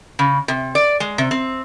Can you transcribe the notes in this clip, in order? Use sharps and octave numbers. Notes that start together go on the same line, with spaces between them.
C#3
C3
D5
G#3
C3
C4